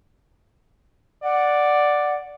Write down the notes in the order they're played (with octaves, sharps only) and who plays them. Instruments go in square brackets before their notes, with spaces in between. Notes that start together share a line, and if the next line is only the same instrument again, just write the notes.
[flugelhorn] D5 [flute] F#5